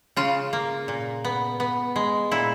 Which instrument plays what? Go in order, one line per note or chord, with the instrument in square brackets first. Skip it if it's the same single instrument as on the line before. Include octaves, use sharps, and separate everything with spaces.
[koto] C#3 F4
A#3
A#2
B3
B3
G#3
A#2 E4